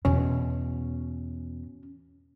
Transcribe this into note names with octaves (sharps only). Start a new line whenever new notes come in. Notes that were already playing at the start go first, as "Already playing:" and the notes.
E2 B2 C#4